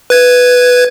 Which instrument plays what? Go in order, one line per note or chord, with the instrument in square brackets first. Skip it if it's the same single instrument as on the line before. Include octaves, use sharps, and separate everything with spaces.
[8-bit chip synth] B4 G#6